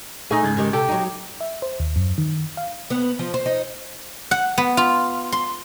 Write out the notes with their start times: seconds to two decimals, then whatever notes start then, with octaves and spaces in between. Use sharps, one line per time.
0.31 A3 D#4 G#4
0.43 C#2 G#2
0.57 D#3 G#3 G4
0.73 C3 G4 A4
0.88 F#3 D#4
1.41 E5
1.62 C5
1.80 D#2
1.96 F#2
2.18 D#3
2.57 F5
2.90 B3
3.19 F3
3.34 C5
3.46 D#4
4.31 F#5
4.58 B3
4.77 F4
5.32 C6